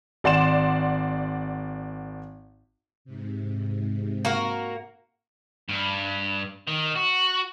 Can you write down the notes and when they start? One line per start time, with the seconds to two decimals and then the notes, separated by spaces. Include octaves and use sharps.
0.24 G#1 D5 F#5 C6 E7
3.05 G#2 C3
4.25 A#3 F#4 A#4
5.69 G2
6.67 D#3
6.95 F#4